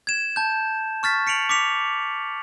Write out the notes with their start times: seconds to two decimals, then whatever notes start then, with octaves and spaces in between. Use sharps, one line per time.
0.07 G#6 E7
0.36 A5 G6
1.03 C#6 F6 A6 B6
1.27 B6 C#7 D7 F7 F#7
1.49 D6 B6 C#7 F7